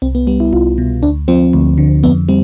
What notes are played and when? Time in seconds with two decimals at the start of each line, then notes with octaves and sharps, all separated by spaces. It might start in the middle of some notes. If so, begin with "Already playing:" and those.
0.02 C2 C4
0.15 B3
0.27 G3 B3
0.40 E4
0.53 C2 F4
0.78 B2
1.02 D2 D4
1.28 F3 C4
1.53 D2
1.78 D3
2.03 F2 B3
2.28 G3 C4